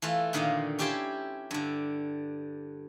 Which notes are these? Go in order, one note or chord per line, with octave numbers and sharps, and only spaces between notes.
E3 A3 F4 A4
A#2 D3 D#3 D#5 F5
C#4 E4 G4 G5 A5 C6
G2 D3